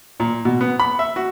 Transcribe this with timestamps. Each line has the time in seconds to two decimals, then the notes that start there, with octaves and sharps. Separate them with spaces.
0.20 A#2
0.45 B2
0.61 B3
0.80 B5
0.99 E5
1.16 F#4